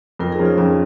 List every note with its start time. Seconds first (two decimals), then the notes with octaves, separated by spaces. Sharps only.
0.19 F2 F4 A#4
0.32 D#4 G#4
0.39 F3 C#4 A#4
0.45 F4
0.58 F2 C#4